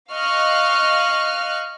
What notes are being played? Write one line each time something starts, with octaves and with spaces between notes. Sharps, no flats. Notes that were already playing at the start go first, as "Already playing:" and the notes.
D#5 F5 C#6 F6 F#6